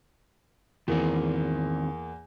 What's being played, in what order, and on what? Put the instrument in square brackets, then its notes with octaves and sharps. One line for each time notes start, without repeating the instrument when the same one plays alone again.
[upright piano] E2 A#3 [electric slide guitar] D#3 C4